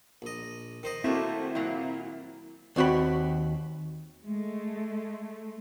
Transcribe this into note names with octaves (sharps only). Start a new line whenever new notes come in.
A#1 D#5
D#3 C5 D#5
A3 A#3 C4 E4 F#4 A4
A#2 F#3 A#3
D#2 C4 F#4 G5 B5
G#3 A3